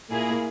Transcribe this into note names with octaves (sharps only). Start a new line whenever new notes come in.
A#2 A#3 E4 G#4